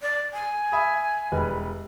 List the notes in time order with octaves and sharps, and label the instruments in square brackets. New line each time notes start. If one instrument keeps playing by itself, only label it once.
[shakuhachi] D5
G#5
[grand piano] E5 B5 D#6
E1 G3 B4